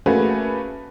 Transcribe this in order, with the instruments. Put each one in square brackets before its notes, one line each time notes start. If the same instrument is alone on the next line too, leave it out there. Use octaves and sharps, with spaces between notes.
[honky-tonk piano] A3 A#3 C#4 F#4 G#4 B4